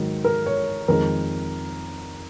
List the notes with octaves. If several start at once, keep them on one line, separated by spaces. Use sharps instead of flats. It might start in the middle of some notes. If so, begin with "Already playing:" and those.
Already playing: G#2 D#3 F#3
A#4
C#5
F2 D#3 G#3 A#4